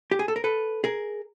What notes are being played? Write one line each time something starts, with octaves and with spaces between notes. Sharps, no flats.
G4
G#4
A4
A#4
A4 B4
G#4 A#4